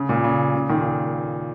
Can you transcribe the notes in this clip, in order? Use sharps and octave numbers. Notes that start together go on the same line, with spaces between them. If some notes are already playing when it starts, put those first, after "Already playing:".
Already playing: C#3
A#2
C#3
C#3
A#2 D#3